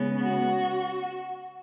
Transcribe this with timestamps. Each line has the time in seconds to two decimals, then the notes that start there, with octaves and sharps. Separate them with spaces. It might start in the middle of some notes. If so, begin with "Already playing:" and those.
Already playing: C#3 G#3 B3
0.21 F#4